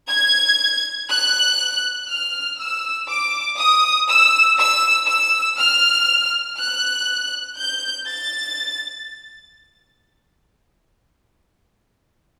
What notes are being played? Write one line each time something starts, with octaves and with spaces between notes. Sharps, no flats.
G#6
F#6
F6
E6
D6
D#6
E6
E6
E6
F6
F#6
G6
A6